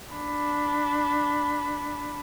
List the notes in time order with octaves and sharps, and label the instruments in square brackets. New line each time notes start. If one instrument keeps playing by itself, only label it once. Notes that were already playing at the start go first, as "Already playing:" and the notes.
[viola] D4 B5